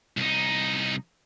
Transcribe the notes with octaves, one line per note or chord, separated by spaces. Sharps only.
C2 D#4